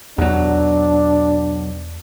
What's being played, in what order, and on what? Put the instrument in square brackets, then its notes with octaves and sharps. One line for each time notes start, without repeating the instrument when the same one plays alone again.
[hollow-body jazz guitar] B1 F#3 [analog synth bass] E2 [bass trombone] D4